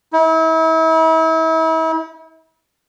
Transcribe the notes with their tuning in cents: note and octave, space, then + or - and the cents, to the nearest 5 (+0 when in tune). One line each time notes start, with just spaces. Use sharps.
E4 -40